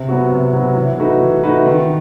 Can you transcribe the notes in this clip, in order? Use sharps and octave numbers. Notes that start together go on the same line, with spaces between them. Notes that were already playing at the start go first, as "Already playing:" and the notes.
Already playing: C3
F#3 B3 F#4
C3
F#3 B3 F#4
E3
A3 D#4 F#4 B4
E3
A3 D#4 F#4 B4
D#3